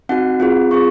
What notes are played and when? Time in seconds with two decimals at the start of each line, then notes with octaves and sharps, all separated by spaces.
0.09 C4 D#4 F#4 F#5
0.40 C4 F4 G#4
0.71 C4 F4 G#4 C#6